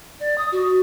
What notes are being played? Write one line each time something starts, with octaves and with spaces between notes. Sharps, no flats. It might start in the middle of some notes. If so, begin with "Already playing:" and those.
D5
D#6
F#4